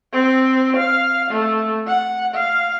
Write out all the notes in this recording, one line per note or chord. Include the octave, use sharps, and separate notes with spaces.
C4
F5
A3
F#5
F5